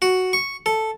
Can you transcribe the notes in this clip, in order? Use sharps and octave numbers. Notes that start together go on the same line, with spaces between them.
F#4
C#6
A4